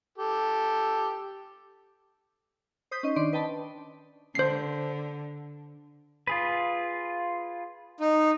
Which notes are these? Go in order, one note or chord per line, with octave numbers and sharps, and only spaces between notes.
G4 A4
C5 D#6 G6 B6
C#4 D#4 D#5
D#3 D4 D5 C6 D7
B4 D#5 G5 A5 B5
D3 C5 C7
F4 G#4 B4
D#4